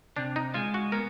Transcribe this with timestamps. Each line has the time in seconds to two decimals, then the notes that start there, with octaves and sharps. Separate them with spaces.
0.16 C3 D4
0.36 D#4
0.54 G#3 F4
0.74 F#4
0.92 B3 A#4